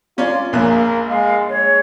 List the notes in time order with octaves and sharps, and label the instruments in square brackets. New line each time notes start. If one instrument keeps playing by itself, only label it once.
[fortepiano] C#4 C#5 D5 [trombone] F4
[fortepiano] A#1 G#5 F#6 [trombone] A#3
[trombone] G#3 [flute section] F5
[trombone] G#3 [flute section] C#5